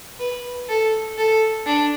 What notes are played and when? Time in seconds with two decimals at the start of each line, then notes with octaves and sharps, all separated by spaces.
0.20 B4
0.69 A4
1.18 A4
1.66 D4